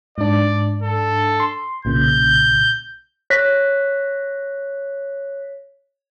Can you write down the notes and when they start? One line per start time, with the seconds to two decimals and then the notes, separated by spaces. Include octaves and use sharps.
0.18 G#2 D4 D5
0.82 A4
1.40 C6
1.85 B1 A#2 C#3 G6
3.30 C#5 F#6 A#6 B6